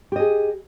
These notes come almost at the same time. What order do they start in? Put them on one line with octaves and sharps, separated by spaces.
G4 D#5 G#4